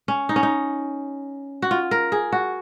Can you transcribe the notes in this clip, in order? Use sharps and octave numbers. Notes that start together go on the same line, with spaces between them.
C#4
D#4
C#4
D#4
F#4
F4
A#4
G#4
F#4